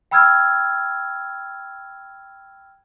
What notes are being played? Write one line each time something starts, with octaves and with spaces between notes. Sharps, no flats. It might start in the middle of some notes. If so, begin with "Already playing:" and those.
G5 B5 E6 F6 G#6